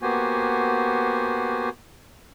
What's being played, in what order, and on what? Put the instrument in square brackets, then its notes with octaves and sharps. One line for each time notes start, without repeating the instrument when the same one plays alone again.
[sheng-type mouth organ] A#3 B3 F#4 G4 C5 G#5